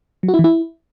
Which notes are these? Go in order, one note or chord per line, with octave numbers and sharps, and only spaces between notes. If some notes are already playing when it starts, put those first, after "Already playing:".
F#3
F#4
E4
E3
E4